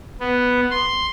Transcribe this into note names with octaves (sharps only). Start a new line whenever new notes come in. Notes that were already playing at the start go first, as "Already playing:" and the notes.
B3
C6